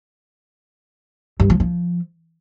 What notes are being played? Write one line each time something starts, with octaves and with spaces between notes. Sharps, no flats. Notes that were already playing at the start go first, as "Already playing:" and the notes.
G2
F3
F3